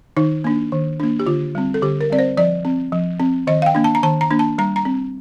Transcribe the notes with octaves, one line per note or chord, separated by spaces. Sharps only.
D#3 D#4
A#3 D4
D#3
A#3 D4
G4
D3 F4
G3 C4
A4
D3 G4
A#4
G3 C4 D5
C5
F3 D5
C4
F3
C4
D#3 D#5
F5
G5
A#3 D4
A5
A#5
D#3 A5
A#5
A#3 D4
A5
G3 A#5
A#5
C4